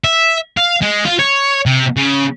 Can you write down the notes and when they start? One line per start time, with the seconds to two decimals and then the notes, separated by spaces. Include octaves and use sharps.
0.04 E5
0.57 F5
0.82 G#3
1.05 F4
1.19 C#5
1.66 C3
1.97 C#3